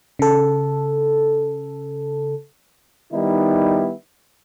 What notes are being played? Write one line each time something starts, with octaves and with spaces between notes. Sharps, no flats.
C#3 A4
D#3 G3 B3 D#4 E4